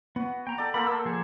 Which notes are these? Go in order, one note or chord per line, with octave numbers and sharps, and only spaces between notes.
B3 F#4
G5 A#5
A4 D5
A#3 A4 C5 B5
A#3 E6
F3 G#4 A4